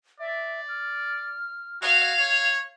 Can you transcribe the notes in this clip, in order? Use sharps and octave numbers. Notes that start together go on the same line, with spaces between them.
D5 E5
F6
F#4 F5 G#6
C#5